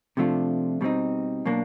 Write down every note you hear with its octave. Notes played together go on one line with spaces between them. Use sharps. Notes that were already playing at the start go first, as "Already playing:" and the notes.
C3 F3 A3 D4 F4
B2 G3 C4 D#4
B2 F#3 A#3 D4